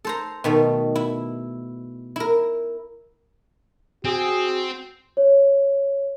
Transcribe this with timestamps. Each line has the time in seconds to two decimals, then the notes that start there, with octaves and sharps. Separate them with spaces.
0.05 A4 C5 A#5
0.44 B2 D#3 A3
0.95 E4
2.16 E4 A#4
4.05 C4 F#4 G#4
5.17 C#5